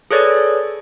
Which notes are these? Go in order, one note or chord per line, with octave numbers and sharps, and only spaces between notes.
G#4 A4 B4 C#5 D5